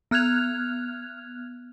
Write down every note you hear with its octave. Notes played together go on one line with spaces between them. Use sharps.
B3 F6 F#6 G#6 F7